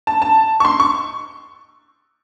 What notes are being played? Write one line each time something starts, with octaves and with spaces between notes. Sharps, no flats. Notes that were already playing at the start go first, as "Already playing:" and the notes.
A5
A5
C#6
C6
C#6